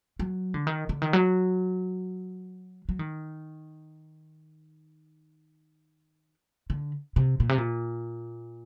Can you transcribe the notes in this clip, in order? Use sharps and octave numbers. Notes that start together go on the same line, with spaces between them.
F#3
D3
D#3
D3
D#3
F#3
F#3
D#3
D3
C3
A#2
C3
A#2